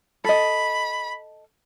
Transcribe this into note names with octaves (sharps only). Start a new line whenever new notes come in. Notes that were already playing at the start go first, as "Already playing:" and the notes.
A4 D#5 B5